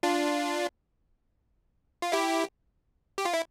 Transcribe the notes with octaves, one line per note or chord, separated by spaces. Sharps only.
D4 F4
F4
E4 G4
G4
F4
E4